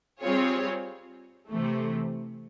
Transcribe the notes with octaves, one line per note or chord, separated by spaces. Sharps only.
G3 C4 F4 G#4 C#5
C3 E3 A3